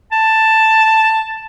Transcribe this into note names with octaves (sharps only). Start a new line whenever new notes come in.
A5